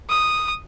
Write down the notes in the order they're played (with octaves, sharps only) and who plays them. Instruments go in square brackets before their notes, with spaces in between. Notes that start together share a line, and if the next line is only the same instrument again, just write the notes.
[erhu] D#6